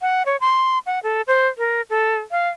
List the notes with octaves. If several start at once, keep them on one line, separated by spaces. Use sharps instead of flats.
F#5
C#5
C6
F#5
A4
C5
A#4
A4
F5